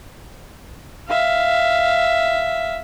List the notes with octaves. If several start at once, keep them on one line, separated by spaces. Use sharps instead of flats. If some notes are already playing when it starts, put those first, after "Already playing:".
E5 F5